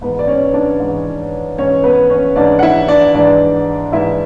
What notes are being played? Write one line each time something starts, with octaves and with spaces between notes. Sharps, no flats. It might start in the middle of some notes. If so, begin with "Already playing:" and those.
G#2 E3 B3 B4
D5
C#4 C#5
D4 D5
G#2 E3
G#2 E3 C#4 C#5
B3 B4
C#4 C#5
G#2 E3 D4 D5
F#5
E4 E5
D4 D5
G#2 E3 D4 D5
G#2 E3 E4 E5